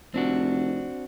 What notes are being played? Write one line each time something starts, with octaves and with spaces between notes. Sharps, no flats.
F1 C4 D4 F#4